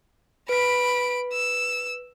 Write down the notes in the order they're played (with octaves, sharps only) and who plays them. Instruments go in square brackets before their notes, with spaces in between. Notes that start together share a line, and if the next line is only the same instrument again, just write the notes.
[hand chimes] B4 B6 [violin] B5 D7
[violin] E6